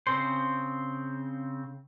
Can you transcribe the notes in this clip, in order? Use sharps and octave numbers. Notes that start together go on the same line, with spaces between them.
C#3 C4 C5